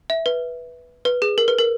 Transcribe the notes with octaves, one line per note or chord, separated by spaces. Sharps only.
E5
B4
B4
G#4
A#4
B4
A#4